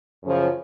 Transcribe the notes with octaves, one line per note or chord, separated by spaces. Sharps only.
F#2 C#3 F3